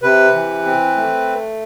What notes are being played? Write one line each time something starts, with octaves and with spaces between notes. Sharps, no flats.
C3 B4
E3
C4
A3